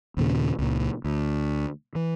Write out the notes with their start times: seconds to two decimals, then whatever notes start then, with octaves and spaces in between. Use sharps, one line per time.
0.17 D#2 A#2 C#3
0.59 C#2 A#2
1.04 D2
1.95 E3